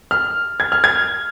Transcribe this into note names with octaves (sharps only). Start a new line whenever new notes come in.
F6
G#6
F6
G#6